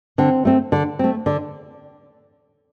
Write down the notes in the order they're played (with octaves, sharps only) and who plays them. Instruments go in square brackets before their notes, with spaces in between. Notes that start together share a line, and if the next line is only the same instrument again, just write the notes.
[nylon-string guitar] D3 C4
A3 C4
D3
A3 C4
D3